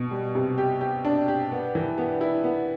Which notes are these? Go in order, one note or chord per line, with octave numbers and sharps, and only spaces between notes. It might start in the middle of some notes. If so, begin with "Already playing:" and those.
Already playing: B2
G3
C3
G4
G4
D4
G4
B3
E3
B3
E4
B3